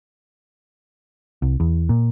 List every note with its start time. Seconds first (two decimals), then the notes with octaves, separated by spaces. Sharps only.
1.42 C2
1.60 E2
1.89 A#2